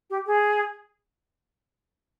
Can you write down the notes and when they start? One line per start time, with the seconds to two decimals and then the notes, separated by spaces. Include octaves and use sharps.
0.10 G4
0.26 G#4